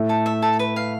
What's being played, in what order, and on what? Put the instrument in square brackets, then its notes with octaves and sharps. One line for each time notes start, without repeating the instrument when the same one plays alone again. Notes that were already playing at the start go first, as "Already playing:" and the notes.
Already playing: [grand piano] A2 A3
[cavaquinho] A4
E5
A4
B4
F5